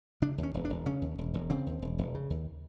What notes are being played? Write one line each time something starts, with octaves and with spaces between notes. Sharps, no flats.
C#3 D4
D#2
C#4
E1
D4
E1
C#3 C#4
D#2
E1
E1
C#3 C4
D#2
E1
E1
C#3
D#2